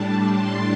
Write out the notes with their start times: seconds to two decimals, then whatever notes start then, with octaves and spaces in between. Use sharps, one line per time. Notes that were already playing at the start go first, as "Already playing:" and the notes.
Already playing: A2 G3 D4 A5
0.30 C6